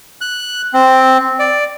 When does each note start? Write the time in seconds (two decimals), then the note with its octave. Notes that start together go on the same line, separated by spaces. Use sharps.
0.21 F#6
0.74 C4
1.39 D5